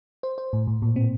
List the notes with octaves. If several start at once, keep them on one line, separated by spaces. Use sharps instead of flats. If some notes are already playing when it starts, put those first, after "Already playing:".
C5
C5
A2
A2
A#2
C4